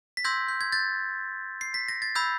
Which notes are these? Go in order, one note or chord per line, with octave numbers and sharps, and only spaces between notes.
B6
C6 E6 G6 G#6 A#6
G6
G#6
G6 A6
C7
B6
A#6
A6
B5 E6 G6 G#6